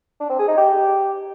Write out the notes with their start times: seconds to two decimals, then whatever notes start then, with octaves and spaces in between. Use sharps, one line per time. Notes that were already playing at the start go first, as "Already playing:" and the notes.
0.21 D4
0.30 C4
0.39 G#4
0.48 D#4
0.58 G4